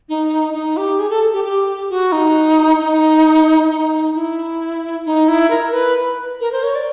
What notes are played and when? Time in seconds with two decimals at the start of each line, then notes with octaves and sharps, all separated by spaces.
0.09 D#4
0.54 D#4
0.77 G4
0.99 G#4
1.10 A4
1.33 G4
1.44 G4
1.90 F#4
2.12 D#4
2.79 D#4
3.70 D#4
4.15 E4
5.06 D#4
5.28 E4
5.50 A#4
5.73 B4
6.41 A#4
6.52 C5
6.63 C#5
6.75 D5